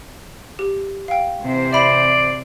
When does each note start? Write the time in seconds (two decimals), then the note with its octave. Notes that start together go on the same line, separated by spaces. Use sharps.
0.59 G4
1.08 F5 G5
1.42 C3 E3 C5
1.73 D5 E5 B5 F#7